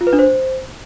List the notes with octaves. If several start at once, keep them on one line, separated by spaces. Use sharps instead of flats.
F4
B4
D4
C5